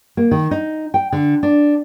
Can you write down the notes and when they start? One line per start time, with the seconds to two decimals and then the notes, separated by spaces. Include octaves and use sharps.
0.17 A#3
0.31 D#3
0.51 D#4
0.94 G5
1.12 D3
1.43 D4